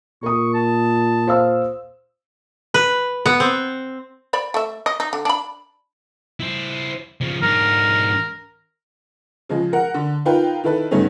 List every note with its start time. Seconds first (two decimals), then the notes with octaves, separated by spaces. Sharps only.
0.23 A#2 A#4 C#6 D#6
0.54 A5
1.27 C5 F5 E6
2.74 B4
3.26 B3
3.40 C4
4.33 C5 D5 B5
4.54 A3 E5
4.86 D#5
5.00 D#4
5.13 D3
5.25 D4 B5
6.40 E4 C5
7.21 C#3 F3
7.42 G#2 D4 A#4
9.49 C#3 F3 G#3
9.73 A#4 F#5
9.94 D3
10.25 D#4 F4 A#4 B4 G5
10.64 D#3 E4 A4 B4
10.91 G2 C#3 A3 B3 C#4 D#4